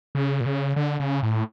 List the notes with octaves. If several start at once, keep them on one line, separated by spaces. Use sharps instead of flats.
C#3
A#2
C#3
D3
C#3
A2